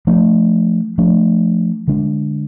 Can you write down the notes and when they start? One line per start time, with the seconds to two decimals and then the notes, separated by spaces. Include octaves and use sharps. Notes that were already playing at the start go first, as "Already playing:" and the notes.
0.07 F3 A3 D4
0.98 F3 A3 D4
1.88 D3 G#3 D4